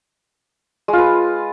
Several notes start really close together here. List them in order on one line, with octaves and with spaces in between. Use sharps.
G#3 F4 B4